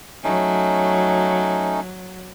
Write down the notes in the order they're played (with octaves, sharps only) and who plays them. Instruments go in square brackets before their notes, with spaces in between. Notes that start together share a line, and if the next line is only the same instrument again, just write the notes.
[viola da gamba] F#3 [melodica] A3 C#4 D#4